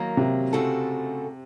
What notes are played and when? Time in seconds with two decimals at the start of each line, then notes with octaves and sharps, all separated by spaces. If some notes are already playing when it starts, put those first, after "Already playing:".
Already playing: D#3 F#3 A#3
0.17 C3
0.53 C#3 A3 C4 F#4 A4